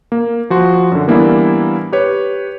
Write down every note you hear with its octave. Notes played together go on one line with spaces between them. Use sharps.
A#3
F3 F#4 C6
F#2 D3
E3 G3 A#3 B3 D4 E4
G4 B4 C#5